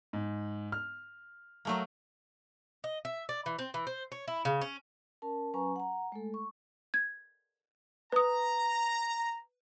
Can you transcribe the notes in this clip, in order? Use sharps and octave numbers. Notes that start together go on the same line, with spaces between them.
G#2
F6
F#3 A3 A#3
D#5
E5
D5
E3
C4
E3
C5
C#5
E4
C#3
C#4
C#4 A#4 A5
F#3 C#4 B4 G#5 A#5 C#6
F#5 A#5
G#3 A3 A4
C#6
G#6
B4 A#5 D#6